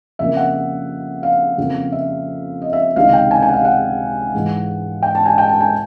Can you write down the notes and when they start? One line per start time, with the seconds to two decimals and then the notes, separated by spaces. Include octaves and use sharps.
0.19 F2 C#3 F3 A#3 E5
0.37 F#5
1.23 F5
1.58 F2 C#3 F3 A#3
1.92 E5
2.62 D#5
2.73 E5
2.96 C#2 C3 D#3 G#3 F5
3.13 G5
3.31 G#5
3.42 G#5
3.49 F#5
3.54 F5
3.65 F#5
4.35 G#2 E3 G#3
5.02 G5
5.15 A5
5.26 G#5
5.38 G5
5.49 A5
5.61 G#5